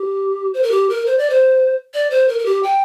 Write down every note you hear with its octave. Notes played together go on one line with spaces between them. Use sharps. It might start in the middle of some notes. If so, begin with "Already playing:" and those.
Already playing: G4
C5
A#4
G4
A#4
C5
D5
C5
D5
C5
A#4
A#4
G4
G5